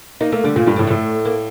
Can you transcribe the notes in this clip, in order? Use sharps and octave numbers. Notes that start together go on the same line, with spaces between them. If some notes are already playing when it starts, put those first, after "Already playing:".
A#3 D#4
A3 A#3
D3 G3
A#2 A#3
G2 A3
A2 G3
A2 A3
A#3